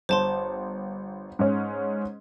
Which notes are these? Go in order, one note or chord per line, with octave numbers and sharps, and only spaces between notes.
G1 C5 A5 C6
G#2 C#4